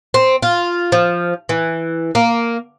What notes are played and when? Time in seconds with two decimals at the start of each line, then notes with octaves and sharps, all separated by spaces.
0.14 C4
0.42 F4
0.92 F3
1.49 E3
2.15 A#3